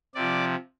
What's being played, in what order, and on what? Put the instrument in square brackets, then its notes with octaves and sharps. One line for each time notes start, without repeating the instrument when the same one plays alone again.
[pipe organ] C3 F3 D5